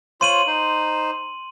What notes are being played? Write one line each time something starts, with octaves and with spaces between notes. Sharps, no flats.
F4 C5 C#5 C6 D#7 F#7
D#4 C5